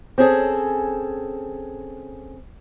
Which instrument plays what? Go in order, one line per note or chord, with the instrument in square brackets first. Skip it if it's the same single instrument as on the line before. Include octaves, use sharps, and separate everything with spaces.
[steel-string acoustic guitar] C4 C#4 G#4 A4